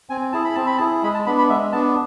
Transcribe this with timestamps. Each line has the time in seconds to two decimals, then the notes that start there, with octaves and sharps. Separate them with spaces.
0.10 C4 G#5
0.32 E4 G#4 A5
0.45 B5
0.55 C4 A5
0.66 B5
0.77 A5
0.80 E4 G#4
1.03 G#3 B5
1.14 A5
1.26 B3 D4 B5
1.38 B5
1.49 G#3 E5
1.72 B3 D4 A5